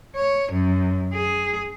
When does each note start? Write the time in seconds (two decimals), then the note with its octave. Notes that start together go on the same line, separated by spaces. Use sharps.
0.16 C#5
0.52 F#2
1.13 G#4